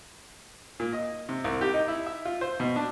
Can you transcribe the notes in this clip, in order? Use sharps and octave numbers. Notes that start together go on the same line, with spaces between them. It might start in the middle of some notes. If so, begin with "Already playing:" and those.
A#2
D#5
C3
C2
G4
D#4
E4
E5
F4
C5
B2
D4